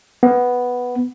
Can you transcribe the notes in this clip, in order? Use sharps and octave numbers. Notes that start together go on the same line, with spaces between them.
B3